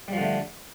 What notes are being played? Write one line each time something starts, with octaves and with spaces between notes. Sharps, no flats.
D3 F3 G3 A3